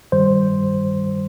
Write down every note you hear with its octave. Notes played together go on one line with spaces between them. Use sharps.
G2 D#3 G3 C5